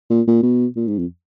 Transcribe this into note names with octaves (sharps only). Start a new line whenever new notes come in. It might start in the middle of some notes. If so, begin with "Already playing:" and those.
A#2
A#2
B2
A#2
G#2
F2